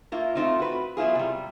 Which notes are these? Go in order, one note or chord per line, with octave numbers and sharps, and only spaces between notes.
A#3 E4 F4
A3 C4 D#4 F4
F#4 B4
F#3 B3 E4 F4 G#4
C3 G3